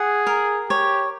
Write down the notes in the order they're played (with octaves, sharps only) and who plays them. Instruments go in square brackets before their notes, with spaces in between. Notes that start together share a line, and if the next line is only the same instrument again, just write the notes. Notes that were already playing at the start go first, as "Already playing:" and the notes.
Already playing: [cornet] G#4 [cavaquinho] F#5
[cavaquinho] A#4
[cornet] G4 [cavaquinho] C#5